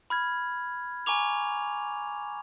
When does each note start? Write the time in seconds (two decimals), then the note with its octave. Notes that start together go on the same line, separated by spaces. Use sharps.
0.10 B5 F6 G#6
1.06 G#5 A#5 C#6 D6 F7